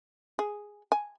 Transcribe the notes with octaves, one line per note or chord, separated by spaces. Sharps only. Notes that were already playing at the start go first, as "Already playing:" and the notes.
G#4
G#5